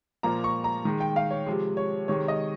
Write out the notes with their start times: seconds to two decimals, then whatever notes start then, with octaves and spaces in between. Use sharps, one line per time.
0.23 A#2 F3 A#3 A#5
0.44 C#6
0.64 A#5
0.85 D#3 G#3
1.00 G5
1.16 F5
1.31 C#5
1.46 C3 F3 G#3
1.77 C#5
2.08 C3 D#3 G#3 C#5
2.28 D#5